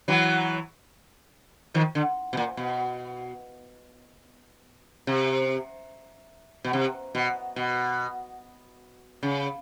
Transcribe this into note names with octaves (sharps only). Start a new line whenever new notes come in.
E3 F#3
D#3 F3
D3
B2
A#2
B2
C3
B2
C3
B2
B2
C#3